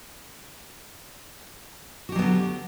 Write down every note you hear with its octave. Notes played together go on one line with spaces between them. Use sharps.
D3 F#3 B3 F#4 G4